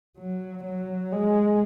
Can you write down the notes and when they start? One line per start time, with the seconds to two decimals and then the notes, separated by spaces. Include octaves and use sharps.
0.18 F#3
0.64 F#3
1.12 G#3